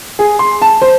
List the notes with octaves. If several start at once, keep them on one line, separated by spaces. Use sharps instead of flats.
G#4
C6
A5
C5